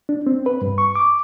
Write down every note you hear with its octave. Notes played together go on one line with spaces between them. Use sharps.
D4
C4
B4
G2
C#6
D6